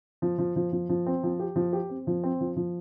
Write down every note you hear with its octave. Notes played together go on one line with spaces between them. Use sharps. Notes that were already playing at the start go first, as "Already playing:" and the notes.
F3
F3
F3
F3
F3
C4
F3
G4
F3
G4
C4
F3
C4
F3
F3